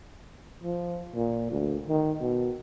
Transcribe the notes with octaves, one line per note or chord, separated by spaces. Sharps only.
F3
A#2
D2
D#3
B2